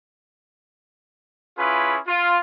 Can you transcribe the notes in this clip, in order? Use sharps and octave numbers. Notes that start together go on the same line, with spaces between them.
C#4 E4 F4 G#4 B4
F4